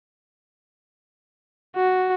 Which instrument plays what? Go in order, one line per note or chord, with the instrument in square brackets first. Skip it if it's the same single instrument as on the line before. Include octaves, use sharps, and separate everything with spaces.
[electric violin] F#4